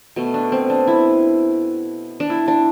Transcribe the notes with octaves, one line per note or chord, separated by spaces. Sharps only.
B2 A3
D4
C4
D4
E4
D4
E4
D4